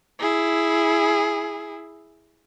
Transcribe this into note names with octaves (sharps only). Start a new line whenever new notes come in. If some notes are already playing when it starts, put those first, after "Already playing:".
E4 G#4